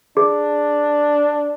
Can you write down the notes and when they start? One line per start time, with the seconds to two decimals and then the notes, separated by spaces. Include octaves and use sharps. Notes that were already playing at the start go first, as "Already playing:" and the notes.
0.17 D4 G#4